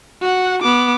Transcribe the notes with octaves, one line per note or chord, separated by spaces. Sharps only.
F#4 F#5
B3 D6